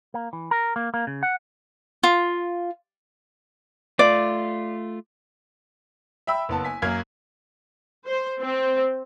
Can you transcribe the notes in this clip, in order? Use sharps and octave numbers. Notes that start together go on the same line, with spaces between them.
A#3
E3
A#4
A#3
A#3
C#3
F#5
F4
A3 F4 D5
E5 G5 B5 E6
F#1 B3 A5
G#5 B6
F#2 A#3 F6 G#6
C5
C4